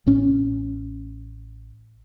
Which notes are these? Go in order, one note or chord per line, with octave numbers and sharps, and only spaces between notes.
A1 A2 C#4